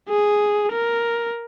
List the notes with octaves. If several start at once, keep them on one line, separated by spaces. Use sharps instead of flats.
G#4
A#4